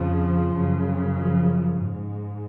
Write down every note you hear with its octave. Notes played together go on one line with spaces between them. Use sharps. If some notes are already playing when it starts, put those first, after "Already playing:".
Already playing: F2 C#3 F3
F#2 C#3
F3
G#2